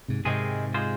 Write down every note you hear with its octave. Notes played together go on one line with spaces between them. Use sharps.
G#2 C3
G#2 C3 D#3 G#3 C4 G#4
G#3 F4 G#4 C5